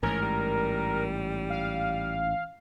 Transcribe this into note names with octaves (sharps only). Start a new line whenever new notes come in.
A1 G#2 C#4 A#4
G3
F5